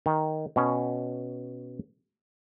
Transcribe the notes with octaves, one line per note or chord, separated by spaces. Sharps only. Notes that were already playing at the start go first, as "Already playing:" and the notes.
D#3
B2 C#4